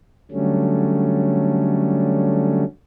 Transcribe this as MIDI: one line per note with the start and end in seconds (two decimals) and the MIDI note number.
0.31 2.64 50
0.31 2.64 54
0.31 2.64 55
0.31 2.64 57
0.31 2.64 61